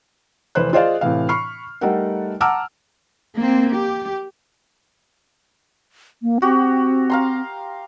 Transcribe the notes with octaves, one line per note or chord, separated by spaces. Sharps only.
F1 E3 B4 C5 F#6
F4 G#4 C5 D5 D#5 F5
A2 C3 E3 F5
B5 C#6 F6 C7
G3 A3 D#4 A4 A#4 F#5
F#5 A5 A#5 D6 E6 F6
A#3 C4
G4
A#3
C4 F#4 G4
F5 A#5 C6